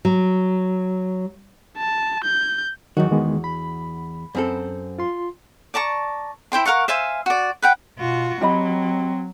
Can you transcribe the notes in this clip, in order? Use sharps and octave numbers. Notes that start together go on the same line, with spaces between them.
F#3
A5
G6
E2 D#3 F#3 D#4 F#4
D#3 G#3 B3
B5
F#2 C4 A4
F4 C6
D5 A5 A#5 C#6
E4 C5 G5 C6
A#4 F5 F#5 C#6
C5 E5 F5 G#5
F#4 D5
B4 F#5 G5
B2 F4 F#4
F#3 C4 G4 D#5 B5